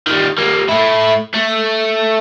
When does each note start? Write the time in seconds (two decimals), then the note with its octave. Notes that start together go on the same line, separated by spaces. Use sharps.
0.07 D#3 G3
0.38 G3 A#3
0.69 A3 E4
1.34 A3